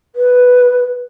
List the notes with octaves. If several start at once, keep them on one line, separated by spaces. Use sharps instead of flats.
B4